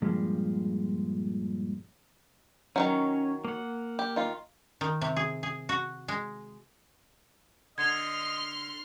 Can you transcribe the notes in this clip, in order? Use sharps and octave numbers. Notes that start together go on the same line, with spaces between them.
G2 A#2 F3 G3 G#3
D#3 E3 F#3 C#4
A#3 F#5
G4
D#3 F4
D#3
C3
G#4
G#4
F#4
G#3
D3 D#5 C6 F6 G#6